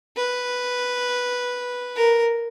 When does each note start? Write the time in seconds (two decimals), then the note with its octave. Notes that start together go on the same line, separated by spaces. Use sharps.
0.16 B4
1.96 A#4